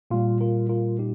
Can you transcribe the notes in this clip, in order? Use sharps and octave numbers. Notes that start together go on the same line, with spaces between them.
A#2 G3 F4
F4 A#4
F4 A#4
D#4 G4